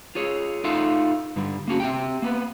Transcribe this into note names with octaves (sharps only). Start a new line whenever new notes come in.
F4 G#4 C#5
D#4 F4 A4 F5
G2 D3 G3
A#3 C#4 F#4
C4 G4 G5
A#3 B3